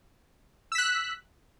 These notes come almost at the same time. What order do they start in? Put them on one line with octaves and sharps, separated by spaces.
E6 B6 F#6